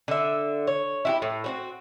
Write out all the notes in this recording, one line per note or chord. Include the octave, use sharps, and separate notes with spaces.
D3 E5
C#5
E4 F#4 G4
A2
C4 C#4 F#4